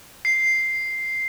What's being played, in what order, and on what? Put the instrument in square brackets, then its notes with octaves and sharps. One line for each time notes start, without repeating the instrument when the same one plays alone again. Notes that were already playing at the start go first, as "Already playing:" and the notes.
[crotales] C7